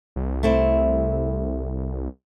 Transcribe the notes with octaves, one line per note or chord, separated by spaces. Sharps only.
C2
A3 C4 E4